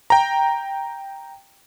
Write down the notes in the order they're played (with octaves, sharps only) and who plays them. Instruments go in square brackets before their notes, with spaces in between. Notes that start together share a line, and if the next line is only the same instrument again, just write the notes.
[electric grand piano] G5 A#5